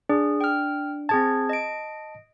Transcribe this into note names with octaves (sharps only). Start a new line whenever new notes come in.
D4 G#4
G5 F6
C4 G#4 A5 G#6
D#5 D7